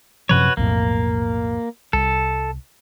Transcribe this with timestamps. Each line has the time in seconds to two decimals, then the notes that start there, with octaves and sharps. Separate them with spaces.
0.29 F#2 C3 F3 F#4 B4 C#5
0.57 B1 F2 A2 A#3
1.93 C2 A4